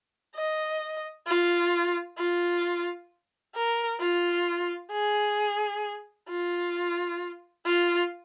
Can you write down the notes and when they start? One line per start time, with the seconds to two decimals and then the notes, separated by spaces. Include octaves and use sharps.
0.36 D#5
1.27 F4
2.18 F4
3.55 A#4
4.00 F4
4.91 G#4
6.29 F4
7.65 F4